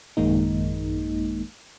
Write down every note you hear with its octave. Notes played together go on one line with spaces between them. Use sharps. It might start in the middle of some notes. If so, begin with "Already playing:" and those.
A1 F#2 D#3 G#3 A#3 D#4